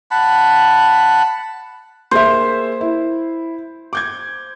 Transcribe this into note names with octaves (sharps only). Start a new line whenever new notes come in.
F#5 A5 B5
A#3 G#4 C5 E5
E4
D6 G6 G#6